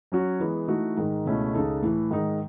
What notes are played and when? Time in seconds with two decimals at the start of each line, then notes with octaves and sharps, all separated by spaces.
0.12 F#3 C#4 F#4 C#5
0.40 E3 G#3 B3
0.68 E3 A3 D#4 F#4
0.97 G#2 D#3 G#3 D#4
1.25 C#2 B2 A3 C#4 E4
1.54 C#2 C#3 G#3 D#4 A4
1.82 A2 E3 A3
2.11 G#2 D#3 G#3 D#4